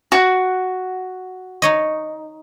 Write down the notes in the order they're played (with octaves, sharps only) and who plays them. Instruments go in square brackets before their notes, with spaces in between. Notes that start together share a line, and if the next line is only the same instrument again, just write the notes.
[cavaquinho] F#4
[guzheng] D#4 C#5 D#5